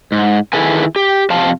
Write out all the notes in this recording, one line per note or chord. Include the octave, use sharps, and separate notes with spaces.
G#2
D#3 E4 G#4 A4 B4 G#5
G4
F2 C3 F5 A5